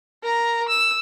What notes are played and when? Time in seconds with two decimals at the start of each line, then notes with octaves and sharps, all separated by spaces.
0.23 A#4 A#5
0.69 E6